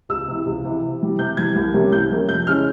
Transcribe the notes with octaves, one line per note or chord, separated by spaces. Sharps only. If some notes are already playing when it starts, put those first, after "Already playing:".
C#2 E6
C3 E3
C#2
C3 E3
C3
E3 G3
C3 G6
E3 G3 G#6
C2
C3 G3 A#3 C#4
C2 G6
C3 G3 A#3 C#4
F2 G6
C#3 E3 G#3 C#4 F6